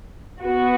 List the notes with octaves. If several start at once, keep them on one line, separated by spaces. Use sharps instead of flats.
B3 F#4